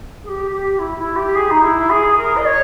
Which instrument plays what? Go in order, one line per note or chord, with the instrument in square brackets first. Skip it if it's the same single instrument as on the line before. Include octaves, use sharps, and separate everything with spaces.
[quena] G#4
G4
G4
E4
E4
G4
G#4
D#4
E4
G#4
A#4
D#5
C#5